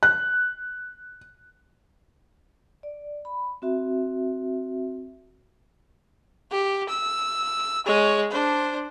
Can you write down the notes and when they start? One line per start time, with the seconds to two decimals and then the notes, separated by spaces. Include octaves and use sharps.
0.03 F#6
2.83 D5
3.25 B5
3.62 C4 F#4 E5
6.52 G4
6.89 E6
7.86 G#3 C#5
8.31 D4 C5